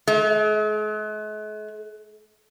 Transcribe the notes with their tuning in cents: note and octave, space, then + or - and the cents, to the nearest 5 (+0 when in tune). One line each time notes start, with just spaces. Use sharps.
G#3 +45